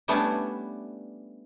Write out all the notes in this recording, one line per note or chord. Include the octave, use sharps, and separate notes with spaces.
G3 A3 B3 C#4 D4 E4